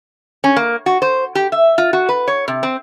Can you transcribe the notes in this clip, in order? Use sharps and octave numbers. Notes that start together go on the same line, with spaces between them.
C#4
A#3
F#4
C5
G4
E5
F4
F#4
B4
C#5
C3
C4